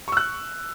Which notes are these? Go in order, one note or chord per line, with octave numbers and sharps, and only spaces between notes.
C#6 E6 F#6